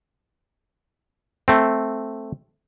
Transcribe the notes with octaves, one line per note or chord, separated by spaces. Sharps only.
A3 C4